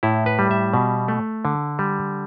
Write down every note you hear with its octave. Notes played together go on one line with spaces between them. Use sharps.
A2 E4
B4
G3
E5
B2
A3
D3
G3